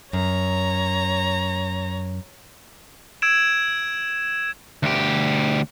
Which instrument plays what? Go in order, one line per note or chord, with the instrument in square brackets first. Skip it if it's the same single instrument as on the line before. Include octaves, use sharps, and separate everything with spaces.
[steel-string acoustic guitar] F#2 [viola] C#5 A#5
[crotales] E6 G#6 D7 E7
[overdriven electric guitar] D2 G4